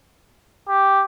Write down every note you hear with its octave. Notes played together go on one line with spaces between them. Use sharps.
G4